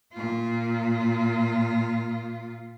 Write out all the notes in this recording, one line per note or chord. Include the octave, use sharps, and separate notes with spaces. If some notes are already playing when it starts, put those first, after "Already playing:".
A#2 F4